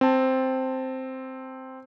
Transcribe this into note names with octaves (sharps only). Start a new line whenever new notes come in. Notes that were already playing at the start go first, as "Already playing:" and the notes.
C4 A5